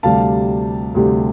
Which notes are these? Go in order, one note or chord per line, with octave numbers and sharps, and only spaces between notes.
D2 C3 G3 F5 A5
D2 C3 G3